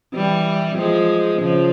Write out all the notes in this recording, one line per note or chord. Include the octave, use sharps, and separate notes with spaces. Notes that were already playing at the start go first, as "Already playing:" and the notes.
E3 G3
F3 G#3
C#3 F3